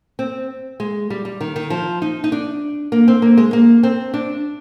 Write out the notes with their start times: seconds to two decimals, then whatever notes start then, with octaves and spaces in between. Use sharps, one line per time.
0.19 C4
0.80 G#3
1.10 G3
1.25 G3
1.41 D#3
1.56 D#3
1.70 F3
2.02 D#4
2.24 D#4
2.32 D4
2.92 A#3
3.08 C4
3.22 A#3
3.37 G#3
3.53 A#3
3.83 C4
4.14 D4